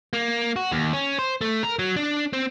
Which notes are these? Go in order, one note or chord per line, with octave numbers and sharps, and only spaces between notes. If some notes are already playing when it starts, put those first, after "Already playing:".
A#3
F#4
D#2
C#4
C5
A3
A#4
F#3
D4
C4